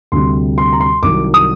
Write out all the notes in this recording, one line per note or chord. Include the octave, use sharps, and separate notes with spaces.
D2 C3 G3 C6
C6
A#5
C6
C2 C3 D#3 F#3 D6
D#6